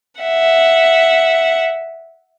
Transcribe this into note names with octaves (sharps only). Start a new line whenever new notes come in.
E5 F#5